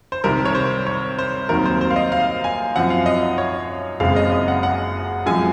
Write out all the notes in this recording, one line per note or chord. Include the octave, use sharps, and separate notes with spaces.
C5
C2 C3 D#3 A#4
C#5
C5
C#5
C5
D#2 D#3 F#3 C4 A#4
C5
C5
F5
D#5
F5
G#5
F#2 F3 C4 F#5
F5
D#5
D#5
C#5
F#1 F#2 C#3 G#3 C4 F5
D#5
D#5
F#5
F#5
F#2 F3 G#3 C4 G#5